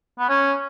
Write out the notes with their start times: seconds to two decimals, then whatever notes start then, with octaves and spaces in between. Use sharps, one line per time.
0.19 B3
0.29 C#4